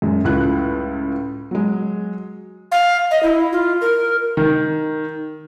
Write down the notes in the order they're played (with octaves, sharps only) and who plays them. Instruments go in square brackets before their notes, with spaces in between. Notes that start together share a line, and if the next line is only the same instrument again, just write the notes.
[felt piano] F#2 G#3
C#2 A2 F4 F#6
F#3 G#3
[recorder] F5
D#5
E4
F4
A#4
[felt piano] D#3